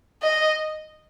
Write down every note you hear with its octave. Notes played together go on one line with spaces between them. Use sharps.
D#5